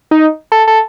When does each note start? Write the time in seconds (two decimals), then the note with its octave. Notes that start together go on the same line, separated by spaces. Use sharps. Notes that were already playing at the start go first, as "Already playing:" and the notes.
0.11 D#4
0.52 A4
0.68 A4